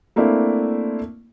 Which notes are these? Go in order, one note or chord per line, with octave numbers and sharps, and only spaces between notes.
A3 A#3 C4 D4 E4